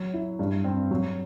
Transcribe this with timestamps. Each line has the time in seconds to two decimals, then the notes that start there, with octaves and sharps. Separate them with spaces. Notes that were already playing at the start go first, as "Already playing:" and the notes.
Already playing: F#3
0.14 E4
0.39 G2
0.64 C4
0.91 F#3